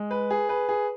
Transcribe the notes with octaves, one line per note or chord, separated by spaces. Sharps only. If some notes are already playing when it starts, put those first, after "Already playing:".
Already playing: G#3
B4
G#4
B4
G#4